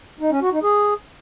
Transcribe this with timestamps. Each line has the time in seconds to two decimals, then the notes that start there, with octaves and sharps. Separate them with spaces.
0.20 D#4
0.31 C#4
0.42 F#4
0.52 D#4
0.63 G#4